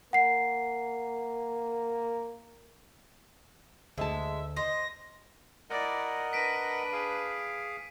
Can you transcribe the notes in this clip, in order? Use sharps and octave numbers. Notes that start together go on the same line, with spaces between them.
A#3 F#5 C7
D2 G#3 E5 A5
C5 D#5 A#6
E4 A#4 D5 D#5 F#5
D4 B4 B6 D7 D#7
G#4 F5